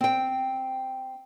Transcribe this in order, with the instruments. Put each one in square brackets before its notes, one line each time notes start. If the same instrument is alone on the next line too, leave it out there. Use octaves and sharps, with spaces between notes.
[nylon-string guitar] C4 G5